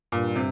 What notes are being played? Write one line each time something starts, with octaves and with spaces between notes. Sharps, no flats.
G2 A#2
C3